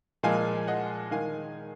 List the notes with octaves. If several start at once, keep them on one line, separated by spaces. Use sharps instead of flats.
A#2 F3 G#3 F5 G#5
D#5 F#5
D#3 G#3 F5 G#5